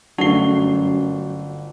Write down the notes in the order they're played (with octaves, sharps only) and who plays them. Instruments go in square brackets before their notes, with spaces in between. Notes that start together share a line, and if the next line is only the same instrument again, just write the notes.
[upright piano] G1 A3 G7 [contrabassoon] F#2 [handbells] D4 C7 [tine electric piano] F#4